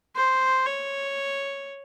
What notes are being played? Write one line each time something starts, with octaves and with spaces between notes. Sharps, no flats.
C5
C#5